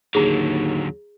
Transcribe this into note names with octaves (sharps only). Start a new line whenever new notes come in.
D#2 D3 F#3 G#4 A#5